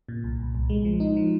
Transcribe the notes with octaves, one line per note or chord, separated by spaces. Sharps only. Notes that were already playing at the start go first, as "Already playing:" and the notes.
A#2
C2
C2
C2
G#3
F3
D#4
F3